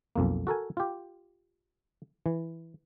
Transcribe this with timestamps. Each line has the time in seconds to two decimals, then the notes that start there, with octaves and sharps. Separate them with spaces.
0.16 B1 F2 A#3
0.47 F#4 A4 A#4 G#5
0.77 F4 G4
2.26 E3